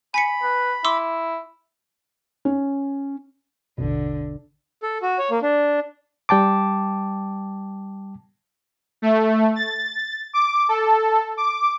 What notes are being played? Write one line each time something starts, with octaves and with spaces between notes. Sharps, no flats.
G#5 B5 B6 C#7
B4
E4 C6 D6 E6
C#4
A1 E2 B2 D3
A4
F#4
C#5
A#3
D4
G3 G5 A5 D6
A3
A6
D6
A4
D6